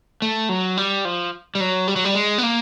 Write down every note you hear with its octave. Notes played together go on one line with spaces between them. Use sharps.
A3
F#3
G3
F3
G3
F#3
G3
F#3
G3
G#3
B3
A#3